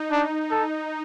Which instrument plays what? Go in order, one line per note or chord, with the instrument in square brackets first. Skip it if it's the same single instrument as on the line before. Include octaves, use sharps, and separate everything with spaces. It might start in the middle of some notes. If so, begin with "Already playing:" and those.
Already playing: [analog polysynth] D#4
[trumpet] D4
A4